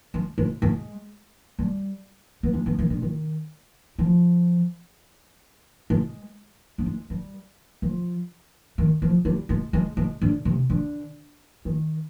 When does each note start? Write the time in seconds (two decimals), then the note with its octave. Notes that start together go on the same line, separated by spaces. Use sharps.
0.14 G#3
0.38 G#3
0.62 G#3
1.59 G3
2.43 B3
2.54 G#3
2.66 B3
2.79 D#3
2.90 D3
3.02 D#3
3.98 F3
5.90 G#3
6.78 B3
6.86 G#3
7.10 G3
7.82 F3
8.78 D#3
9.02 F3
9.25 G3
9.49 G#3
9.73 G#3
9.97 G#3
10.22 D3
10.45 C3
10.70 D3
11.65 D#3